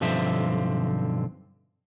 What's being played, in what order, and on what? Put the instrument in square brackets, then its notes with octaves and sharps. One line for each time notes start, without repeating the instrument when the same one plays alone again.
[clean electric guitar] B1 G2 D3 F3 C4 E5